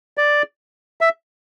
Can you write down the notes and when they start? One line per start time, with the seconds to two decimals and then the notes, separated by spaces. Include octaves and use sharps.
0.18 D5
1.01 E5